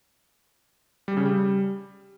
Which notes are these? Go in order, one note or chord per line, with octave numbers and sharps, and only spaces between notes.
G3
C#3
G3